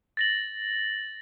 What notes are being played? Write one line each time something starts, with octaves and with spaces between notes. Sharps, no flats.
A6 A#6 F#7